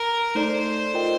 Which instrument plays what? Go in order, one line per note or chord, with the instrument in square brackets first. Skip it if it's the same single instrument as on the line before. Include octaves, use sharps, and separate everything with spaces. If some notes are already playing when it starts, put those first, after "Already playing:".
Already playing: [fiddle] A#4
[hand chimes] A3 D#4 A4 D5 [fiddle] C5
[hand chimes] F4 A#4 D#5 G5